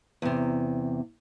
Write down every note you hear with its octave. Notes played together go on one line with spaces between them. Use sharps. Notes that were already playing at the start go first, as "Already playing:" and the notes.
E2 C3